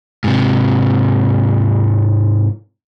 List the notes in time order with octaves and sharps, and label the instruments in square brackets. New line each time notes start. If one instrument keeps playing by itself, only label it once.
[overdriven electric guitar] G#2 C3